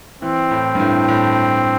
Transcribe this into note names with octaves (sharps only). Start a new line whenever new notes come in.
E3 C4
A2
G2
A2
A2